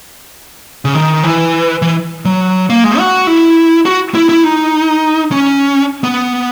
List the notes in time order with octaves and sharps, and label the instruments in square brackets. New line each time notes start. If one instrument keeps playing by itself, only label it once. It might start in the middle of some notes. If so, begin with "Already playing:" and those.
[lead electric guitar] C#3
D#3
E3
E3
F#3
A#3
G#3
F#4
E4
F#4
E4
E4
D#4
C#4
B3